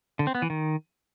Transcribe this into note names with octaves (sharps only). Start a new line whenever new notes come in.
D3
C4
B3
E3
D#3